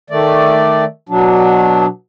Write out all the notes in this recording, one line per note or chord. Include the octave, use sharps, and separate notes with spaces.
D#3 A3 D5
B2 F#3 D4